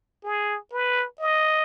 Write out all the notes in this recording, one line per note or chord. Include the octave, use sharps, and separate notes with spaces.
G#4
B4
D#5